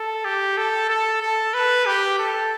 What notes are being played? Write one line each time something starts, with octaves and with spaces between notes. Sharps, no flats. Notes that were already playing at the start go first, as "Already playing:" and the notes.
Already playing: A4
G4
A4
A4
A4
B4
G4
A4